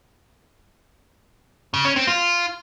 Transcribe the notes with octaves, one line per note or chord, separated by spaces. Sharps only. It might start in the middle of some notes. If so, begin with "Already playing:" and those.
C#3
C#4
C4
F4